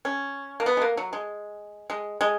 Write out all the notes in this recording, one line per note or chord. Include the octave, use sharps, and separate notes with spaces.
C#4
A#3
B3
G#3
A#3
F#3
G#3
G#3
G#3